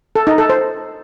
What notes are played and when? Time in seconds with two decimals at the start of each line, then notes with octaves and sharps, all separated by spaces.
0.16 A4
0.27 D#4
0.38 A4
0.49 C5